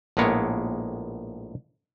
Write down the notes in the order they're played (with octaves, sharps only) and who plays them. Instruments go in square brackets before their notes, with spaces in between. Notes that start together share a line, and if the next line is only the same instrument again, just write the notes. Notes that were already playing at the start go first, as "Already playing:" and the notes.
[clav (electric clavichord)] A#1 A2 G#3 A#3 B3 C#5